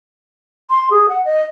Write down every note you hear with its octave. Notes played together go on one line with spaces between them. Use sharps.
C6
G#4
F#5
D#5